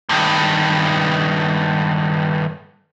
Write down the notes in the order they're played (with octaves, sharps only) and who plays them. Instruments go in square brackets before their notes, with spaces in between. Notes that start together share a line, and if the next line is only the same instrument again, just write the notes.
[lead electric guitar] G2 D#3